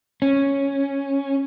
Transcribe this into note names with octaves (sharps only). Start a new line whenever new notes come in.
C#4